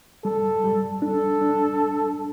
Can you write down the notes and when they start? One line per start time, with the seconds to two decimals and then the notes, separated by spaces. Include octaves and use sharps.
0.24 G3 A4
0.64 G3
1.02 D4 A4
1.42 D4